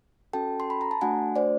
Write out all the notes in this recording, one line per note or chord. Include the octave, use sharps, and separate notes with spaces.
C#4 F#4 A4 G5 A5
C6
B5
A#5
A5
A3 D4 F#4 F#5 G#5
C5 D5